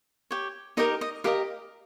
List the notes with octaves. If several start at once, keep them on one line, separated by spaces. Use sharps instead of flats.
G4 C#5
D#4 G4 A#4 D#5
D#5
G4 A#4 D#5 F5